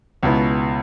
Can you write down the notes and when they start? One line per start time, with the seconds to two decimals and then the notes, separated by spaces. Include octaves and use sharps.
0.23 C#2 B2 B3 E4